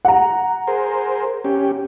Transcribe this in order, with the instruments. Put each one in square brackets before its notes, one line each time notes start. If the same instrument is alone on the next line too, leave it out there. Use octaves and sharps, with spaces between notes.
[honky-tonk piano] F#5 A#5
[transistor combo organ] G#4 A#4 C5
C#4 G4